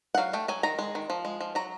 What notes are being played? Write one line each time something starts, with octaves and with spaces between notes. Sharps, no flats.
F#5
F#3 F5
A3 G5
F#3 G#5
D#3 A#5
G#3
D#3
F3
G#3
F3
F#3 A#5